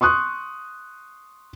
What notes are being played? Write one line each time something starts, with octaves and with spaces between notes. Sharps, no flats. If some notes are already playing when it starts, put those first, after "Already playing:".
C6 C#6 D#6 F#6